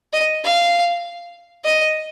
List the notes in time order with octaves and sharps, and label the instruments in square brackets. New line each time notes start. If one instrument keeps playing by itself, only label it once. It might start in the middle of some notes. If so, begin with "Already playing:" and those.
[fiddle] D#5
F5
D#5